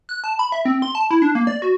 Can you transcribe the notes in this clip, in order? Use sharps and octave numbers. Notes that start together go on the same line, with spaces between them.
F#6
A5
B5
E5
C4
C6
A5
E4
D4
A#3
D5
F#4